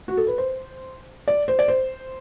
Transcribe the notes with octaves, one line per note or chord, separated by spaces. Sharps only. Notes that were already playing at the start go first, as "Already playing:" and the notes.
F#4
A4
B4
C5
D5
C5
D5
C5